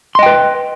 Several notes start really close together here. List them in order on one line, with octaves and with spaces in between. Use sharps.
C6 D#5 G5 B4